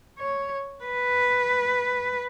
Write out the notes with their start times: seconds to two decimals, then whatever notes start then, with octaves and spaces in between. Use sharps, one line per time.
0.19 C#5
0.83 B4